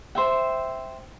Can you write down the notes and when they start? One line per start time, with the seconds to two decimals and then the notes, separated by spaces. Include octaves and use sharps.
0.15 C5 E5 G5